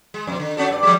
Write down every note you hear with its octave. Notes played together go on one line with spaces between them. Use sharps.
G#3
F2 B2
D3
C#4 F#4 A4
G2 D5
F3 G3 G#3